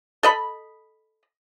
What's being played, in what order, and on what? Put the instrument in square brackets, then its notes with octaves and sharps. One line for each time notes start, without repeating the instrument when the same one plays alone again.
[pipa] A4 D#5 B5